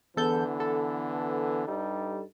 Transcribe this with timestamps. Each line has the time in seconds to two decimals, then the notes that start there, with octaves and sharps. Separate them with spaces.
0.16 E2 D3 E3 B3 A4 G6
0.60 A4
1.68 G2 G3 D#4